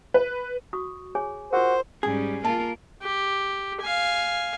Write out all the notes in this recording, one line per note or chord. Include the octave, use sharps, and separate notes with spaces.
B4
F#4 C#6 D#6
G#4 C#5 G#5
F4 F#4 G#4 A#4 C5
G#2 G3 C#4 G#4
A#3 F4 A#4 A5
G4
F5 G#5